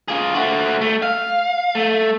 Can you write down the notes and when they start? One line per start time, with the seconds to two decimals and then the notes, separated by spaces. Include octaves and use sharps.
0.08 F4 G#4
0.34 A3 F#4
0.81 A3
1.02 F5
1.75 A3